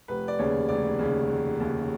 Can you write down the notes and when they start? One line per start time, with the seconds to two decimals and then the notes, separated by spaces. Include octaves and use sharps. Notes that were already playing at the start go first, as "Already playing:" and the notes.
0.08 F1 B4
0.28 D5
0.39 D#2 C#3 C#5
0.69 F1 D5
0.99 D#2 C#3
1.29 F1
1.60 D#2 C#3